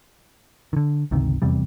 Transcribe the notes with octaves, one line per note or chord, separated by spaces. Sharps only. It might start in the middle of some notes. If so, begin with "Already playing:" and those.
D3 D#3
G1 C#2 C3 D#3
F1 E2 C3 G3